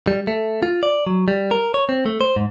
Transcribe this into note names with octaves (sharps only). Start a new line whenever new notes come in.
G3
A3
F4
D5
F#3
G3
A#4
C#5
C4
A3
C5
G#2